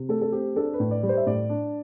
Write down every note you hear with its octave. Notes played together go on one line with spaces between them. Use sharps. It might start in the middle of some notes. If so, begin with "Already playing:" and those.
Already playing: C3
A3 A4
A4
C4 G4
D4 A4
B4
A2
D5
G3
C5
E5
A2 D5
D4